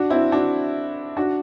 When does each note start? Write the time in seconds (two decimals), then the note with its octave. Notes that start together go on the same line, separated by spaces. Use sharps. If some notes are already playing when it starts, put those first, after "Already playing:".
Already playing: D4 F#4
0.10 C4 E4
0.32 D4 F#4
1.17 D4 F#4